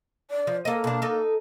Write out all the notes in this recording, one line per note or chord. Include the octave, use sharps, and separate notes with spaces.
D5
F3
A#3 A4 D#5
B2 D4
D#4 A4